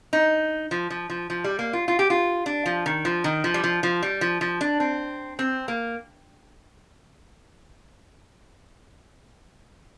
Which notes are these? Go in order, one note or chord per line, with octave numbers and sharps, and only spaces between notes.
D#4
F3
F3
F3
F3
G3
A#3
F4
F4
G4
F4
D4
F3
D#3
F3
D#3
F3
G3
F3
F3
G3
F3
F3
D4
C4
C4
A#3